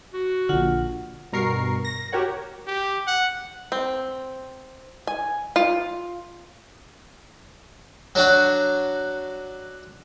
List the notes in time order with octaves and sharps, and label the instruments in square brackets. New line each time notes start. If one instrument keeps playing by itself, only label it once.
[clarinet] F#4
[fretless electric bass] A#1 D3 [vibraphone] F4 F#5
[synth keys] G2 B2 A#4 C#6 C7
A#6
F#4 G4 A#4 C#5 F#5
[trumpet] G4
F#5
[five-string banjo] C4
G#5
F4
[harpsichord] F#3 D4 F#4